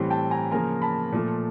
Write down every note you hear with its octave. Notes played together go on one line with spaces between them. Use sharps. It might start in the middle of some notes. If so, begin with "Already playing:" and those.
Already playing: A2 E3 G3 C4
G5 A5
G#5 A#5
C#3 F3 A#3 G#5 A#5
A5 B5
A#2 F3 A3